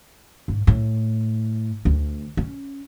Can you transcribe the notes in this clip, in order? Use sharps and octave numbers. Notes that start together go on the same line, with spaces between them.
G#2
A2
D2
C#4